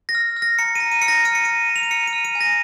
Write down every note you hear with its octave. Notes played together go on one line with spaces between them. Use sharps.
A#6
F6
F6
A#6
A#5 C#7
A#5 D#7
D#7
F6 C#7
A#6
F6 D#7
C#7
A#5 D#7
A#5
F7
D#7
F6 C#7
D#7
F6
D#7
G#5
A#6